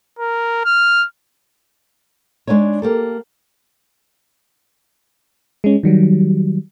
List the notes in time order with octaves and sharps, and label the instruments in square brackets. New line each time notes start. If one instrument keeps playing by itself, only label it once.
[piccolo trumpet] A#4
F6
[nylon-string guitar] G#3 A3 D4 D#4 C#5
A#3 G4 A4
[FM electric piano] G#3 C#4
D#3 F#3 G3